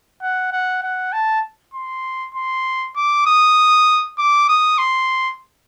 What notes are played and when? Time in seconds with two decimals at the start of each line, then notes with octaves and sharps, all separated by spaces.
0.22 F#5
0.52 F#5
0.83 F#5
1.13 A5
1.74 C6
2.35 C6
2.96 D6
3.26 D#6
4.18 D6
4.49 D#6
4.78 C6